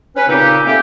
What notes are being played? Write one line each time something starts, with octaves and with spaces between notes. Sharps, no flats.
C#4 B4
A#2 C#3 C4 D#4 G4
A3 A#3 C4 C#4 G4